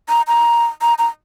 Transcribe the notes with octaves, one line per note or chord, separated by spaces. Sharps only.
A#5
A#5
A#5
A#5